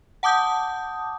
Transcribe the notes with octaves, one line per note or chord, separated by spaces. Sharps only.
F#5 A5 D6 D#6 G6